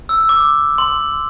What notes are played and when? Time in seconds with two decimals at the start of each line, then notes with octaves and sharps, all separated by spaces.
0.09 E6
0.29 D6
0.78 C6